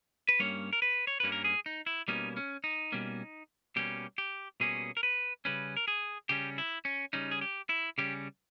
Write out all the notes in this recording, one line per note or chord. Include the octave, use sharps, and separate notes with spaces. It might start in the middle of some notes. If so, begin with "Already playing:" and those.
B4
G2 G3 A#3 C#4 C#5
A#4
B4
C#5
G2 G3 A#3 C#4 B4
A#4
G#4
D#4
E4
B2 G3 A#3 C#4 D#4
C#4
D#4
B2 G3 A#3 C#4
B2 G3 A#3 C#4 G4
G4
B2 G3 A#3 C#4 G#4
A#4
B4
C#3 G3 C#4 B4
A#4
G#4
C#3 G3 C#4 G4
E4
C#4
C#3 G3 C#4 D#4
G#4
G4
E4
C#3 G3 C#4 G4